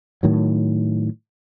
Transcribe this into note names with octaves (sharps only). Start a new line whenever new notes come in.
A2 D#3 F#3